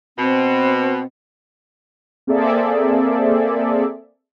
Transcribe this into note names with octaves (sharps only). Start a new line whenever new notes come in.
B2 C4
A#3 C4 G#4 A4 D5 E5